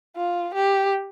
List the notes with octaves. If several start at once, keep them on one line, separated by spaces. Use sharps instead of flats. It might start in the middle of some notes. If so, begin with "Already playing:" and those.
F4
G4